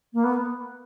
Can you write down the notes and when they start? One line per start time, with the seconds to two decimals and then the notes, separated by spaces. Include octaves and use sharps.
0.14 A#3
0.24 B3